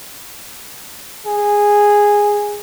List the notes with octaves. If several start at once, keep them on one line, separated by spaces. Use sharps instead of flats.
G#4